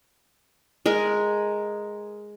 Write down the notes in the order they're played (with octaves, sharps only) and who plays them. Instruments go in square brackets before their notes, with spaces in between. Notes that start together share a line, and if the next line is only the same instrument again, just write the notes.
[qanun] G#3 A#4